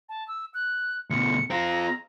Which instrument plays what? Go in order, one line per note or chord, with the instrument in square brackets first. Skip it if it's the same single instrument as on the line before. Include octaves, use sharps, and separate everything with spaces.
[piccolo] A5
E6
F#6
[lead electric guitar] D2 B2 [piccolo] C#7
[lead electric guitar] C4 F4 [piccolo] A#5